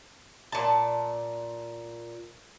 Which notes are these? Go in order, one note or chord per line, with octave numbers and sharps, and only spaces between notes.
A#2 A5